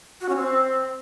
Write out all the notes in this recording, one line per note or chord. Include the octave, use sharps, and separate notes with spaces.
F#4
C#4
C4